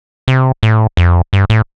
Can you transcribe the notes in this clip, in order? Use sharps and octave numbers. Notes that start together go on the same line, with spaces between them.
C3
A2
F2
G2
A2